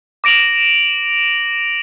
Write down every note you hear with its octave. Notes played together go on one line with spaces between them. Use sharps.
D6 A#6 D7 F7 F#7